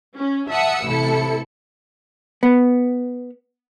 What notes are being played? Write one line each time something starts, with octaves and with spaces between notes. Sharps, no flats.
C#4
E5 F#5 A5 D#6 E6 C#7
A1 C3 E4 A4 C#7
B3